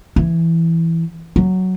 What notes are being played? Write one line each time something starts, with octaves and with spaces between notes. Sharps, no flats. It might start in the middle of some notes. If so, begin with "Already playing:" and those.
E3
F#3